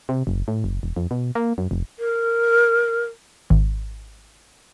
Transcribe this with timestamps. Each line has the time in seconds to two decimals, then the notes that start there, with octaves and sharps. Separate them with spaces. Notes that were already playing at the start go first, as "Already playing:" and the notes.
0.09 C3
0.27 F#1
0.48 A2
0.64 F#1
0.83 E1
0.96 F2
1.11 B2
1.35 A#3
1.58 F#2
1.71 F1
1.99 A#4
3.50 G#1